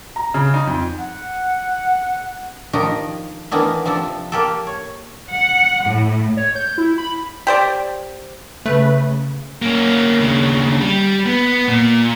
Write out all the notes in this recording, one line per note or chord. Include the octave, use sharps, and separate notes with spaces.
A#5
C#3
D#4
F2
F#5
D#3 F3 D4 D#4 G4
D#3 E3 A#3 B3 D4 E4
C3 F3 D4 A4
A#3 G4 A4
C#5
F#5
A2
C#5
G6
E4
B5
G4 C5 D5
C#3 A3 B4 B5
A#3 C#4
D#2 C#3
G3
B3
A#2